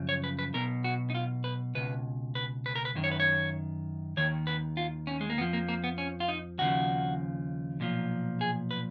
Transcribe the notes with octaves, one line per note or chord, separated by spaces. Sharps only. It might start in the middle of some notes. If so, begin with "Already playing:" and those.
Already playing: F#2 C#3 F3
C#5
B4
B4
B1 B2 A#4
F#4
D#4
F4
B4
C#2 B2 B4
B4
B4
A#4
B4
F#2 D#3
C#5
B4
C#5
D#2 D#3 C#5
B4
F4
C#4
G#3
A#3
F2 F3 B3
A#3
A#3
B3
C#4
F4
D#4
D#2 C#3 F3 F#4
B1 A#2 F3
G#4
B4